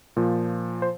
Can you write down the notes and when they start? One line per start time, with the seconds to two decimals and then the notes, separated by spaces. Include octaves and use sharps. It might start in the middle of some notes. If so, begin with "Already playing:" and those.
0.17 A#2 F3
0.82 C5